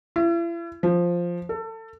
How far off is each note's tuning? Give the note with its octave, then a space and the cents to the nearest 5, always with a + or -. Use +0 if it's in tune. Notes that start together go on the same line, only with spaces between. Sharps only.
E4 +40
F3 +0
A4 +25